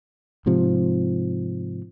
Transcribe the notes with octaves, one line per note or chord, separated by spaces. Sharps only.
G#2 C3 F3